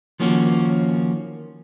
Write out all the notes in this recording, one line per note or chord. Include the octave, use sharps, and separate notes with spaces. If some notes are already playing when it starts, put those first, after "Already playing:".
D#3 F3 A#3 C#4 F#4